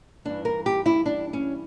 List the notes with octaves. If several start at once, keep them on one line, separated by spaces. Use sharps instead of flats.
G2 E3 D4
A#4
G4
E4
D4
C#4